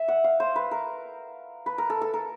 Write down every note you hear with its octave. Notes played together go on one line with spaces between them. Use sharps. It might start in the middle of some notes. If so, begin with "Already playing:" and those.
Already playing: E5
F#5
F5
C5
B4
A#4
B4
A#4
A4
A4
A#4